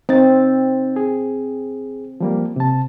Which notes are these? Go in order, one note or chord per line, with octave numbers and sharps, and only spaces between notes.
C4 D#4 A6
G#4
F3 G3 A#3
C3 A5